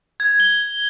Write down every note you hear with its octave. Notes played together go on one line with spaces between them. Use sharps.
G#6
G7